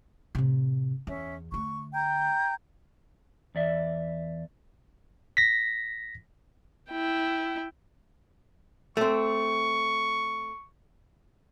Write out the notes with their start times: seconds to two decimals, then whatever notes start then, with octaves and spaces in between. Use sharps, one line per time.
0.35 A2 C3
1.07 E2 C#4 E5
1.52 D3 A3 C#6
1.93 G5 A#5 G6
3.55 E2 D5 E5
5.37 A#6 B6
6.90 E4 G5
8.97 A3 C4 C#6